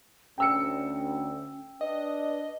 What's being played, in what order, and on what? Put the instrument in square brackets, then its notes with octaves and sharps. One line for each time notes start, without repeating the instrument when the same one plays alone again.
[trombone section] D2 [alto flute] C#4 [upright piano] G5 E6 C#7
[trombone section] D4 [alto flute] B4 [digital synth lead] D#5